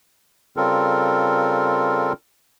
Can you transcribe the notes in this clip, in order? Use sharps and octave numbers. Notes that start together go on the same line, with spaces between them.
C#3 G3 C4 F4 A4 A#4